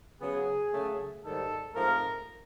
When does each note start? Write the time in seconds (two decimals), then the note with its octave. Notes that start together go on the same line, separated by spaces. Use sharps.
0.21 C#3 F#3 B3 G#4
0.73 C#3 F#3 A3
1.24 G#2 D#3 G3 A4
1.75 G#2 F3 A3 C4 A#4